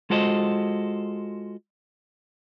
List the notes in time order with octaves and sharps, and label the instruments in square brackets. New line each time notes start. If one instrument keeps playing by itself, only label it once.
[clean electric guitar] G#3 F4 F#4 A4 C5 D#5